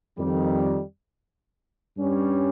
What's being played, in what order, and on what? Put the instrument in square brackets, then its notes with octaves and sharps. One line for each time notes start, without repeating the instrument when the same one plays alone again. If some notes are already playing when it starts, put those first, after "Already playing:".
[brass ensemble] F2 D#3 G3
G2 G3 C#4